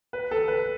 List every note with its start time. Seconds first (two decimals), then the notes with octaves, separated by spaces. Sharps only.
0.13 B4
0.31 A4
0.48 B4